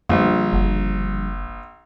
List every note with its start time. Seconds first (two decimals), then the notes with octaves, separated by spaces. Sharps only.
0.09 A#1 F#2 D3 F3 G3
0.53 F#1